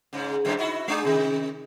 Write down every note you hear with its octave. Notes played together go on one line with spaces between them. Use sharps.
G#2 C#3
F#2 A2 D3
D#4 E4 F#4
G#3 D4 G#4
C3 D#3